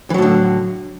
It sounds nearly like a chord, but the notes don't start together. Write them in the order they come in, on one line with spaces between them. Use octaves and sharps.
E3 F#3 A2 D3